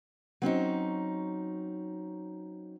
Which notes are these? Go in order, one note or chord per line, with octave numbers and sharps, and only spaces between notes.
F#3 C4 C#4 D#4